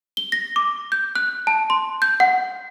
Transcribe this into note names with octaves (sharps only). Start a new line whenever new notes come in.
G7
A#6
D6
G6
F#6
A5
C6
G6
F#5